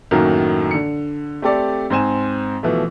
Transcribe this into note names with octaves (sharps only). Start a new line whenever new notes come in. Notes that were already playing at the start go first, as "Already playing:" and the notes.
F#2 A2 D#3 A#3 F#4
D3 C#7
A3 C4 G4 A4 D5
G#2 C4 C5 G#5 E7
B2 E3 F3 A3